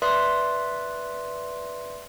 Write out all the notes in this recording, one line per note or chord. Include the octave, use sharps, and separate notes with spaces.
B4 D5 E5 C6 D#6 B6